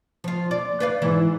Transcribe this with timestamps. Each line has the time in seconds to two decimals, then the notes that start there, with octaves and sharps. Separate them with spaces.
0.24 F3 F4
0.51 D5
0.80 B4 D5 F5
1.02 G#2 E3 E4